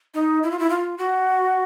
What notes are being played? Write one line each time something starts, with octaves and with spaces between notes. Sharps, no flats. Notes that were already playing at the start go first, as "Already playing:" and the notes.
D#4
E4
F4
E4
F4
F#4